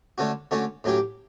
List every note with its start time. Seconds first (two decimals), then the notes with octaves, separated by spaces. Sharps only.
0.18 D3 A3 C#4 F#4
0.51 D3 A3 C#4 F#4
0.84 A2 F#3 C#4 G4